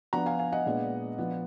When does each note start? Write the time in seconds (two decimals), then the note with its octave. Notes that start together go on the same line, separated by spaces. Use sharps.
0.13 F3 B3 D4 F#5 A#5
0.26 F5 G#5
0.39 F5 G#5
0.52 D#5 F#5
0.66 A#2 G#3 B3 D4
1.18 F3 B3 D4